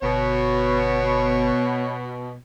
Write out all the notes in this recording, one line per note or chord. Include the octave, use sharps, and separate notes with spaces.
G1 B2 C#5